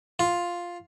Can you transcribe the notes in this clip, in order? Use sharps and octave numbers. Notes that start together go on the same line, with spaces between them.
F4